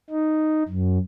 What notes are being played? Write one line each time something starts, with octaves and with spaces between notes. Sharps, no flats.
D#4
F#2